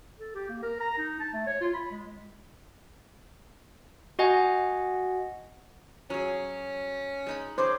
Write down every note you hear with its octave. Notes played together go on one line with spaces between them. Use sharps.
A4
G4
A#3
A#4
A#5
D#4
A5
A3
C#5
F4
B5
G#3
F#4 D#5 F#5 G#5
F#3 C#4 G#4
G#3 D#4 B5
C#4 D#4 G#4 C5 D6